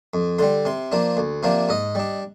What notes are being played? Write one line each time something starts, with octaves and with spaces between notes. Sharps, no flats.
F2
D3 G3 C6
C3 C6
F3 A#3 D4
D2
C3 F3 A#3 D4
G#2 D#5
G3 D4